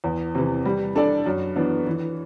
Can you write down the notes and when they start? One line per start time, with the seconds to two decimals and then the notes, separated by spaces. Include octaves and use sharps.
0.04 E2
0.35 C3 E3
0.65 G3
0.96 D4 A4 D5
1.26 F#2
1.56 E3 B3 D4
1.87 E3